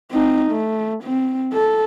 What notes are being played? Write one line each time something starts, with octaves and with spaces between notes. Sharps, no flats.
C4 D#4
A3
C4
A4